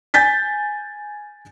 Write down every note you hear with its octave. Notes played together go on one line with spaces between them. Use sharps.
G#5 G6 A6 B6